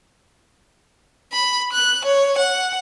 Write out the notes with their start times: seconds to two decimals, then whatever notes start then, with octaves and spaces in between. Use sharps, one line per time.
1.33 B5
1.73 F#6
2.05 C#5
2.38 F#5